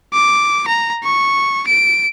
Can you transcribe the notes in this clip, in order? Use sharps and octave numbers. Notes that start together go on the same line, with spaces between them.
D6
A#5
C#6
D7